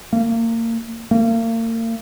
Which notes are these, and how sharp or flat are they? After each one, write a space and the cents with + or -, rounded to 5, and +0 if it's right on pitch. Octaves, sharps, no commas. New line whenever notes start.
A#3 -30
A#3 -40